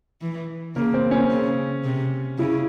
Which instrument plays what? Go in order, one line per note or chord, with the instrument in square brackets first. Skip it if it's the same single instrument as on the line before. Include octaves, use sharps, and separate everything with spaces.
[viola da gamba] E3
[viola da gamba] C#3 [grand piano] A#3
[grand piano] C4
C#4
[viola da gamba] C#3
C3
[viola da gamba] C#3 [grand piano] E4